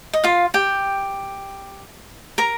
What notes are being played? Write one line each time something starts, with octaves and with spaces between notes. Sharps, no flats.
D#5
F4 F5
G4 G5
A#4 A#5